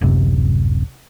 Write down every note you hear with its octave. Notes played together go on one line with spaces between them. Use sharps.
D1 G#1 F#2 C3